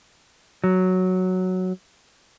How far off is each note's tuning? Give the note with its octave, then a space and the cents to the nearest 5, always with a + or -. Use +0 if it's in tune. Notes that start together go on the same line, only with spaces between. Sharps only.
F#3 +0